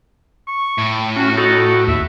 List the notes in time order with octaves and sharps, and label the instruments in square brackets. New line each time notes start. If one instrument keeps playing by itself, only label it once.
[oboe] C#6
[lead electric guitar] A2
[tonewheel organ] C#4 [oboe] F#4
[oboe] D#4 [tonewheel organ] F#4 A4
[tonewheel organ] D#2 [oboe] E5